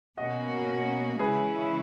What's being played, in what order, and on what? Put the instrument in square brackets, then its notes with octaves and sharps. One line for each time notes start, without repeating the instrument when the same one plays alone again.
[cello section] B2 A#3 C#4 F#4 [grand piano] D#5 F#5
[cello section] C#3 E3 G#3 C#4 E4 [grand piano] G#4 B4